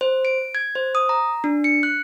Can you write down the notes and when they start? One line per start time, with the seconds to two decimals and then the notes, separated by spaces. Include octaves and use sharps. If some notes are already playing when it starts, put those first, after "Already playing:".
0.01 C5
0.25 D7
0.55 G#6
0.75 C5
0.95 D#6
1.09 A#5
1.44 D4
1.64 C#7
1.83 F#6